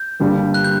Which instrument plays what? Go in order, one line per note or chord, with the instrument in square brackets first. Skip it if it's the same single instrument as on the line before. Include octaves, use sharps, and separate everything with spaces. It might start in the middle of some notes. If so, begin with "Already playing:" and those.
Already playing: [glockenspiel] G6
[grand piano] G1 G2 D3 G3 A#3
[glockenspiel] F#6
G6